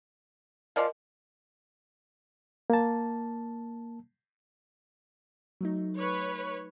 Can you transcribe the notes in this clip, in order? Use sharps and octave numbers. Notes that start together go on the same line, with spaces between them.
F3 A#4 D5 D#5 F5 G#5
A#3 A5
F#3 A3 D#4
B4 C#5 C#6